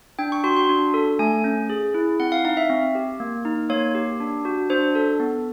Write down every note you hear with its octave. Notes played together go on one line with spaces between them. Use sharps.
D4 G5
C#6
F#4 C6
C6
D4
A4
A3 G#5
C#4
G#4
E4
C4 F#5
F5
D#4 F5
E5
C4
G4
A#3
D#4
A#3 C#5
G4
D4
F#4
D4 C5
A4
B3